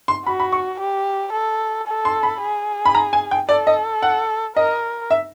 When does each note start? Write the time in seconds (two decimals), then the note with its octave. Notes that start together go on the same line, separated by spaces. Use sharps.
0.08 C6
0.25 F#4 B5
0.40 B5
0.52 C#6
0.80 G4
1.33 A4
1.88 A4
2.05 C6
2.23 B5
2.41 G#4
2.86 B5
2.95 A#5
3.13 G#5
3.31 G5
3.49 A4 D5
3.67 D#5
4.02 F#5
4.56 A#4 D#5
5.10 E5